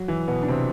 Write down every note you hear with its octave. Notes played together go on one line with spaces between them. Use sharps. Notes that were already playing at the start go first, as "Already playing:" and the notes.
Already playing: F#3
E3
B2 B3
D4
C3 C4